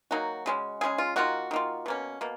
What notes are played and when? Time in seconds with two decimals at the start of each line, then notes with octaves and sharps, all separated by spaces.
0.11 D#3 F#3 A#3 D#4 F#4
0.46 C#3 G#3 C#4
0.81 C#3 G#3 C#4 G#4
0.98 F4
1.16 D#3 A#3 F4 F#4
1.51 D#3 A#3 F4
1.86 B2 A#3 C#4
2.21 B2 A#3